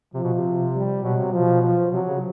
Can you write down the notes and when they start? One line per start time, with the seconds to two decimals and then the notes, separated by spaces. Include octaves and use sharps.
0.14 C3 F3
0.24 B2
0.33 C3
0.74 G3
1.04 B2 F#3
1.18 C3
1.33 B2 F3
1.62 F3
1.92 C3 F#3
2.08 C#3